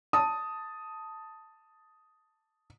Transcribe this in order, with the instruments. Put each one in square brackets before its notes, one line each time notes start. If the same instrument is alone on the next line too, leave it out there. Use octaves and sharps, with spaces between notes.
[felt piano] A5 D#6